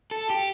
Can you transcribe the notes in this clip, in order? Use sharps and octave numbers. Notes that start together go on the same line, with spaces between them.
A4
G4